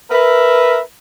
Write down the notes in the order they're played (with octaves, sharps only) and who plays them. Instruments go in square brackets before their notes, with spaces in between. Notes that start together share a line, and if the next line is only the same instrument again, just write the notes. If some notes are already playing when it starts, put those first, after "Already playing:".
[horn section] A#4 B4 E5